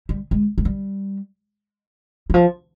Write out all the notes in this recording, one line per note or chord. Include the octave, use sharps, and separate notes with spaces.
G3
G#3
G#3
G3
D#3
F3